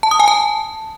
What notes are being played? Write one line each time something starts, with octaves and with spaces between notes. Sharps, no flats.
A5
D#6
G#5
A5